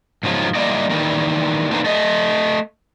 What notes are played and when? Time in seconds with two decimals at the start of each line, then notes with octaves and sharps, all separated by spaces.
0.23 G#2 C#3 F3 F#3
0.55 G3 A#3 E4 D5 D#5
0.90 D#3 E3 G3 A#3
1.71 A3 A#3 C4 D4 D#4 B4
1.84 A3 D#5